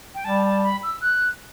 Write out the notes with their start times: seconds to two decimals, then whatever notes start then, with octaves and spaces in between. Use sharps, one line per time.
0.15 G5
0.25 G3 A5
0.45 A5
0.63 B5
0.83 E6
1.01 F#6